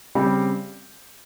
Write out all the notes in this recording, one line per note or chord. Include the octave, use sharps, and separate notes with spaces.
C#3 G3 C4 G4